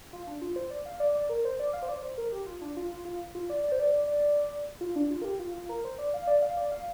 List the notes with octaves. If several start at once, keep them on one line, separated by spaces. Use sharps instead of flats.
F4
D4
F4
C5
D5
F5
D5
D5
A#4
C5
D5
F5
C5
D5
C5
A#4
G4
F4
D4
F4
F4
F4
F4
D5
D5
C5
D5
D5
D5
F4
D4
F4
A#4
G4
F4
F4
A#4
C5
D5
F5
D5
F5
D5
F5